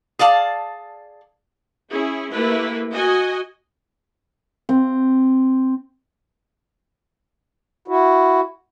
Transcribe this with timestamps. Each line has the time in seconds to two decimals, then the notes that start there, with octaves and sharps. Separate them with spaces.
0.19 G#4 D5 F5 A5
1.91 C#4 E4 G#4
2.30 A3 A#3 E4 G4 B4
2.93 F#4 D#5 G#5
4.69 C4
7.88 E4 F#4